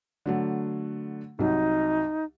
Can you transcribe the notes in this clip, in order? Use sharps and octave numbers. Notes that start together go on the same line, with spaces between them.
D3 F#3 A3
C2 F#3 D#4